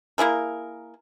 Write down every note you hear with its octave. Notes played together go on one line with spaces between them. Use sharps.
A#3 E4 G#4 A#4